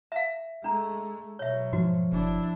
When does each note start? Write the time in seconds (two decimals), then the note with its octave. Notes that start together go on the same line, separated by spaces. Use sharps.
0.12 E5 F5 E7
0.64 G#3 A3 D4 A#5
1.39 B2 F#3 C#5 E5
1.73 G#2 F3 F#4
2.13 F#1 D4 E4